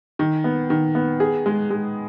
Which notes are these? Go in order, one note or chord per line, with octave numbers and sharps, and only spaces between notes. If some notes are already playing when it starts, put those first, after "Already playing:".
D#3
B3
D#3
B3
G#4
G#3
G#3